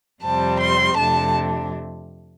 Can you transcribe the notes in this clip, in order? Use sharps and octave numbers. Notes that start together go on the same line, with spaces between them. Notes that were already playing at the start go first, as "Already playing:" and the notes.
F2 C3 G3 C4 A5
C6
F2 C3 A3 D4 A5